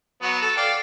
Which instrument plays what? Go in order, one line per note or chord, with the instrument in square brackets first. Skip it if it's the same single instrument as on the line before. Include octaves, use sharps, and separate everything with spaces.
[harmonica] F#3 B3
A4
D5 F5 G5